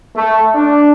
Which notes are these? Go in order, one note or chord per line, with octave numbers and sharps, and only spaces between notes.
A3
D4